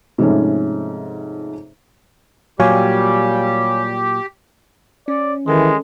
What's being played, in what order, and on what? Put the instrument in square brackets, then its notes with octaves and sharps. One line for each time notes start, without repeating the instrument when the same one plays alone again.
[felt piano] G#2 C3 F3 A3 C#4 D#4
[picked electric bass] A#2 F#3 [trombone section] G3 [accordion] G4 [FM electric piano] C#5 F5 G#5
[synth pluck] C#4 [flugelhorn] D5
[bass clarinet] D#3 [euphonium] E3 [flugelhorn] G#3 [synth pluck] A4